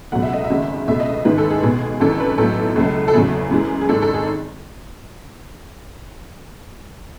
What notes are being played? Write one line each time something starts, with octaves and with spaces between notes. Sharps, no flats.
C#2 B2 F#3 A3 F#5
E5
D#5
E5
G#1 F#2 C#3 G#3
C#2 B2 A3 E5
D#5
A1 G#2 D#3 G#3 B4
A4
G#4
B1 B2 G#3 G#4
G#1 F#2 E3 A4
B4
B1 A2 F#3 A3 A4
C#2 C#3 F#3 A3
A4
E2 C#3 F#3 A3 G#4
F#2 E3 G#3
G#4
G#1 G#2 D#3 A4
A4
G#4